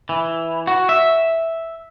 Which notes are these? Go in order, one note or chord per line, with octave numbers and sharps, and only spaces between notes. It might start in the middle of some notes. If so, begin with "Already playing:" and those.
E3
F#4
E5